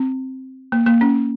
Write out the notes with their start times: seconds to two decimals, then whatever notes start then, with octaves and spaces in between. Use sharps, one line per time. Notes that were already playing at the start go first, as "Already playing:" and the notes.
Already playing: C4
0.72 A#3
0.86 A#3
1.01 C#4